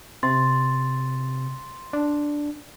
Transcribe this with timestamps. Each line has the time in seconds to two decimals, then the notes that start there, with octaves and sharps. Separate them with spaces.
0.23 C3 C6 A6
1.93 D4